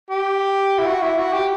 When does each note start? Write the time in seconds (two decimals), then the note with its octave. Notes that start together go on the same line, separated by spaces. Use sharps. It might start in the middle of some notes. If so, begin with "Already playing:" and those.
0.10 G4
0.79 E4
0.86 F#4
1.02 E4
1.18 F#4
1.33 G4